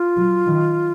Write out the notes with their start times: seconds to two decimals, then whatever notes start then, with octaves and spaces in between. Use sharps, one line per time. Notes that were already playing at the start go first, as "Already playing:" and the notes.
Already playing: F4
0.17 F#3
0.47 D#3